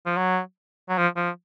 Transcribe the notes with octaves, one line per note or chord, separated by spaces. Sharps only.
F3
F#3
F#3
F3
F3